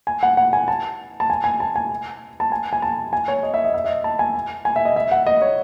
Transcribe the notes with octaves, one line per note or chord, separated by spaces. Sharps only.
G#5
F#5
F#5
G#5
A5
A5
G#5
G#5
A5
G#5
A5
G#5
G#5
A5
G#5
C#5
D#5
E5
D#5
E5
D#5
A5
G#5
G#5
E5
D#5
E5
F#5
D#5
C#5